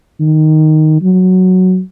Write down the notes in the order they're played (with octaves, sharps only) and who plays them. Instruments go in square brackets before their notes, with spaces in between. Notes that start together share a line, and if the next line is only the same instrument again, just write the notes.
[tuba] D#3
F#3